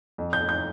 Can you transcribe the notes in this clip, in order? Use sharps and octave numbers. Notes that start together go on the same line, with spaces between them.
F2
G6
F2
G6